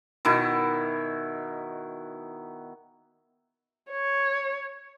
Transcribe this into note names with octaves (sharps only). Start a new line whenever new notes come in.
B2 D#3 E4
C#5